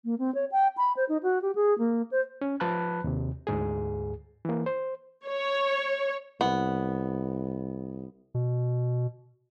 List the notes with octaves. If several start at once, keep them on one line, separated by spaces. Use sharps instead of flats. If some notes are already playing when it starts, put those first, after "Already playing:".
A#3
C4
C#5
G5
B5
C5
D#4
F#4
G4
G#4
A#3
C5
C#4
F3 B4 A5 B5 F#6
D#2 C3
D2 G#2 G#4
E3 A#3
C5
C#5
C2 B3
B2